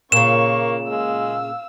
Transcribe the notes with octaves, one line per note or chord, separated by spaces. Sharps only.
A#2 C#3 A#3 C#6 E7
G#3 F5 E6